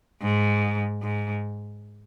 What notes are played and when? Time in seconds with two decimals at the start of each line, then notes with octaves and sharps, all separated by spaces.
0.22 G#2
1.03 G#2